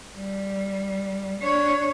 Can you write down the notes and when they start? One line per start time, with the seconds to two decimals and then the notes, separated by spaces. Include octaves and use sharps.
0.16 G3
1.39 D4 C#5